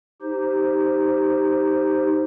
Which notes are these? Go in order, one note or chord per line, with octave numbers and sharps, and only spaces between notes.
D#4 G4 C5